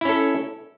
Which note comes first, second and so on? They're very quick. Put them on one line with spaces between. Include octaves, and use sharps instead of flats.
E4 C#4 A4